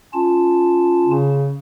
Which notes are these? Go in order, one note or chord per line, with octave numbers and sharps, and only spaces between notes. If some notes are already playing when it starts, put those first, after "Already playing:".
C#4 F4 A5
C#3